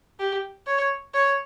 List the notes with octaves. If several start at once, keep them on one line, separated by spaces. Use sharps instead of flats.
G4
C#5
C#5